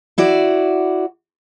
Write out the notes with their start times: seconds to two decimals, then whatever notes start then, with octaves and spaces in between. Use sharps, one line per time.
0.18 E4 F#4 D5